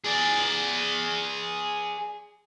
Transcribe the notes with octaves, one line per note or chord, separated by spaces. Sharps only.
G#4 D5